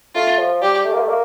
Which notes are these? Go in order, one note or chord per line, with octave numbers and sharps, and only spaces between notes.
A3 F4
F3
G3 G4
A3
A#3
A3
A#3